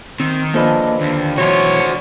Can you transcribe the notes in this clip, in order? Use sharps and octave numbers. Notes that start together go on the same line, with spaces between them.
D#3 C4
F3 A#3 D4 A4 B4 D#5
D#2 D3
B2 E3 F#3 F#4 C5 C#5